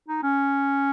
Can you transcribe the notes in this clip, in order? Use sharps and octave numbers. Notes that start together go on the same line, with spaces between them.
D#4
C#4